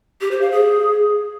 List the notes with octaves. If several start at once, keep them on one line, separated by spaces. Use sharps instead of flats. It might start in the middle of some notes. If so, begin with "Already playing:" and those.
G4
C5
F5
G#4